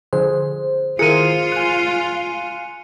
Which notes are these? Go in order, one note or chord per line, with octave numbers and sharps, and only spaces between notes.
D3 F3 G#4 C5
D#3 E4 F4 G#4 A#4 C5 C#7 D#7
G#5 F#6